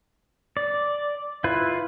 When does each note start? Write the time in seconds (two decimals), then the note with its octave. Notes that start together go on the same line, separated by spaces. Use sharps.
0.57 D5
1.44 E4 F4 B4